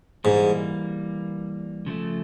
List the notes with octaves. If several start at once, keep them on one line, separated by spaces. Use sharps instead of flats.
G#2 E3 G3 A#3
C#3 F3 A3